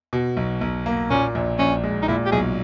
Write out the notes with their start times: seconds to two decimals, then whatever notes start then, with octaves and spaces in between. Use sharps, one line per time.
0.13 B2
0.37 B1
0.61 B1
0.86 A#3
1.10 A#2 C#4
1.35 A#1
1.59 A#1 C#4
1.83 G#3
2.02 D#4
2.08 A#2 E4
2.26 G4
2.32 B1 G#4